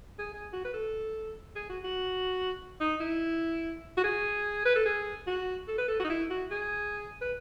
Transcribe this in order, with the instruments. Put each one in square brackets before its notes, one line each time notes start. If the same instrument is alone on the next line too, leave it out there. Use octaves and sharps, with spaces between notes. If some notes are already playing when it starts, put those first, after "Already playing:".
[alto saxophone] G#4
G#4
F#4
B4
A4
G#4
F#4
F#4
D#4
E4
F#4
G#4
B4
A4
G#4
F#4
A4
B4
A4
F#4
D#4
E4
F#4
G#4
B4